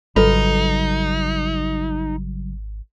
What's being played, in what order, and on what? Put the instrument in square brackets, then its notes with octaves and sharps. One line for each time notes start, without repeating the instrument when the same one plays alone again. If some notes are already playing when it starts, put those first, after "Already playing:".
[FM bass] G#1 [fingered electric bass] C#3 F#3 G3 [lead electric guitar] D#4 [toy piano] F4 A4 B4